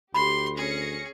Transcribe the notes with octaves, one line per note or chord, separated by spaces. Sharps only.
D2 G4 B5 C6
C#4 G#4 A#6 C#7